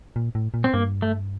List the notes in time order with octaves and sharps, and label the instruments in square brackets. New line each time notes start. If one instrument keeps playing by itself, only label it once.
[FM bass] A#2
A2
A#2
[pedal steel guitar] C4
[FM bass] G2 [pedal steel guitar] A#3
[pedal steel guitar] A3